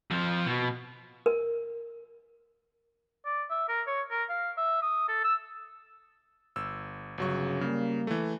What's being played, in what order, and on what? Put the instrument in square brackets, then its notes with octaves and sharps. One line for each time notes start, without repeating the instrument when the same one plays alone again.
[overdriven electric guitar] F2 F3
B2
[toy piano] A#4
[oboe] D5
E5
A#4
C#5
A#4
F5
E5
D#6
A4
E6
[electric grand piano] G1 E6
[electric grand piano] G1 F#3 C#6 [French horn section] C#3
[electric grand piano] C#3 [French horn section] G3 A#3
[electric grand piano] E3 A3